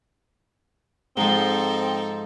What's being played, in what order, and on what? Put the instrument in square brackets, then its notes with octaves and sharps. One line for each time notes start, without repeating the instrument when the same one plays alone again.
[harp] G#2 F3 [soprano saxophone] C4 [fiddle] D#4 A4